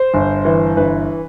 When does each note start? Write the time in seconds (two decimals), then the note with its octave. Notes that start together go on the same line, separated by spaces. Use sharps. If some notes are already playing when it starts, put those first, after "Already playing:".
Already playing: C5
0.14 G1
0.45 E3
0.77 G1 B4